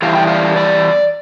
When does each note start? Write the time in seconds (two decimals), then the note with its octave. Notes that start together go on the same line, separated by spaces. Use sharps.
0.02 E3 G3 D4 F5
0.15 G5
0.27 F5
0.56 D5